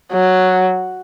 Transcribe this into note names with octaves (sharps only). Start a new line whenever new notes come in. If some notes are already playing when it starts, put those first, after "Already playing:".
F#3